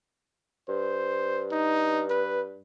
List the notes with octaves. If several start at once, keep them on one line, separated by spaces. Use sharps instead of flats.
G2 C5
D#4
B4